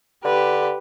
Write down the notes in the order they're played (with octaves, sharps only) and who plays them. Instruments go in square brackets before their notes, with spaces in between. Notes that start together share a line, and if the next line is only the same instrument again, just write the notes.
[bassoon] D3 [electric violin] G4 B4